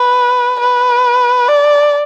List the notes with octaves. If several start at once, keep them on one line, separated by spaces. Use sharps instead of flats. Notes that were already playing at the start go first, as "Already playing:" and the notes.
Already playing: B4
B4
D5